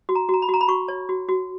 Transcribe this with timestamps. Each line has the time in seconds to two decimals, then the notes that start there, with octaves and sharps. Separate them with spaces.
0.09 F#4
0.15 A#5
0.29 F#4
0.34 A#5
0.42 B5
0.49 F#4 A#5
0.61 B5
0.68 F#4 C#6
0.88 C#5
1.09 F#4
1.29 F#4